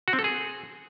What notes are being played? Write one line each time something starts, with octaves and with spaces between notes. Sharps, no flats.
F#4
C4
A4
G#4